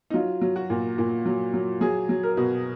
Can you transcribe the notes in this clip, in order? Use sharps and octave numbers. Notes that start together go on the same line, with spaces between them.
D#4
F#3 F4
F#3
F#4
A#2
A#2
F#3
F#3
F#3 G#4
F#3
A#4
B2